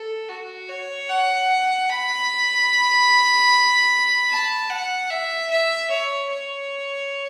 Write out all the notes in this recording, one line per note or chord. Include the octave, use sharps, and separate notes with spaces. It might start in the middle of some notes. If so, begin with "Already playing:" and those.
Already playing: A4
F#4
C#5
F#5
B5
A5
F#5
E5
E5
C#5
C#5